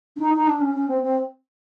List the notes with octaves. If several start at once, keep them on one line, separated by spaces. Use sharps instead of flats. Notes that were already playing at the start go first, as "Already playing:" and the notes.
D4
D#4
D#4
D4
C#4
C#4
C4
C4